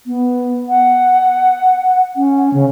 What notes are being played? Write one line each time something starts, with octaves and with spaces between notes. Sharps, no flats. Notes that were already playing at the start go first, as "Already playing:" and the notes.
B3
F#5
C#4
C#3